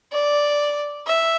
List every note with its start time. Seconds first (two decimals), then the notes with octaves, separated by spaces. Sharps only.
0.12 D5
1.07 E5